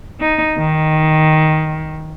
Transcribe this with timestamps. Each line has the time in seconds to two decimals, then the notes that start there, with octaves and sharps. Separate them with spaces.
0.20 D#4
0.58 D#3